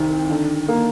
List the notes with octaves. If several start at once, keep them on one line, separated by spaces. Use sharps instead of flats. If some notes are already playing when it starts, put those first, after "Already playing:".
Already playing: C2 D#3 C4
D3
A#3